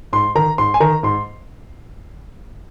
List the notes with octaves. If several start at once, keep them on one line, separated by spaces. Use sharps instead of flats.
G#2 C6
D#3 A#5
G#2 C6
G#5
D#3 A#5
G#2 C6